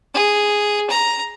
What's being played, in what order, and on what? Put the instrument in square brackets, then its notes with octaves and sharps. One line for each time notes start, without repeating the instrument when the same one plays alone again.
[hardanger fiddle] G#4
A#5